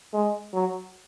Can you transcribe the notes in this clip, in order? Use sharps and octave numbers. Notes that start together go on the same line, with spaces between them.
G#3
F#3